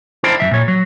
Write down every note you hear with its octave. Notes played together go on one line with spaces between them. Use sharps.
D4 E4 A#4 C5 G5 A5
F#2 E3 E5
A#2 C#5
F#3